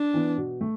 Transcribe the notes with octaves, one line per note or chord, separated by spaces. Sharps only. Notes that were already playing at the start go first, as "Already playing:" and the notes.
Already playing: D4
E3 B3
B2
A3